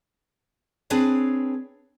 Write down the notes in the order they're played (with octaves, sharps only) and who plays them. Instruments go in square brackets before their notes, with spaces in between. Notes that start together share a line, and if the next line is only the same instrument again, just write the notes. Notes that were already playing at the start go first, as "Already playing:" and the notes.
[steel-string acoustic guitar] C4 D4 G#4 B4 C#5